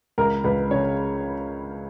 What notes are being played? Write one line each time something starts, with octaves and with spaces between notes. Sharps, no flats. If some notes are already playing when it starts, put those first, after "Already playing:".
C#2 A#4
C#2 B4
C#3 C#5